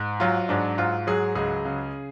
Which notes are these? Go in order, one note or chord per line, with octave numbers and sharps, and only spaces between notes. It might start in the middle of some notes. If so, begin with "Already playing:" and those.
Already playing: G#2
F#3 F4
G#2 D4
G#2 F4
F#3 G#4
C#2 G#4
C#3